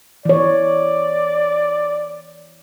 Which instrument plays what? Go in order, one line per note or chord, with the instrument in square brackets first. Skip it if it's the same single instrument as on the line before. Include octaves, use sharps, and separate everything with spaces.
[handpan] E3 C#5 [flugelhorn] D5